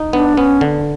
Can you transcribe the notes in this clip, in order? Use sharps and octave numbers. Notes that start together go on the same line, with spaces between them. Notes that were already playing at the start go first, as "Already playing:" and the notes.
Already playing: D#4
B3 D4
B3 C#4
D3